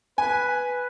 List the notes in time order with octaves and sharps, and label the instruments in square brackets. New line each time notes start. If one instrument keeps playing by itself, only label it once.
[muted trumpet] B4 [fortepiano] G#5